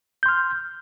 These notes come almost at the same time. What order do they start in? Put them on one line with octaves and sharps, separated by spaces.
G6 C6 F6